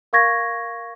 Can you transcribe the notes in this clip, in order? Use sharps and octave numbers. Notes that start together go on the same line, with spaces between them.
A#4 F5 C#6 G#6 A#6